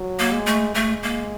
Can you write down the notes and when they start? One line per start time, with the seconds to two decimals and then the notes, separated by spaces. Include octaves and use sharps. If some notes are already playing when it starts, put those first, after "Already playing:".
Already playing: F#3
0.19 A#3
0.33 G#3
0.46 A3
0.75 G#3 A3
1.03 A#3